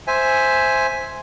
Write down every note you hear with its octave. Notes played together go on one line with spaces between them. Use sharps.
C5 E5 G#5